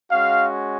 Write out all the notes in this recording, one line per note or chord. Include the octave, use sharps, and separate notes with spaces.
G#3 C#4 F#4 F5